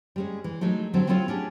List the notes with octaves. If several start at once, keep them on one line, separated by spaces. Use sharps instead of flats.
G3 G#3 C#4
E3
F#3 G#3 A3 D#4
D3 F#3 G3 C4
F#3 C4 E4 F4 A4 C#5
C#4 D4 G4 G#4